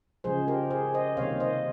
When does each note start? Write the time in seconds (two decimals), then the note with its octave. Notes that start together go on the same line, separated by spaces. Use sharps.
0.24 C#3 F3 G#3 G#4 C5
0.48 G4 A#4
0.71 G#4 C5
0.94 C5 D#5
1.17 C3 D#3 G3 A#3 C#5 F5
1.40 C5 D#5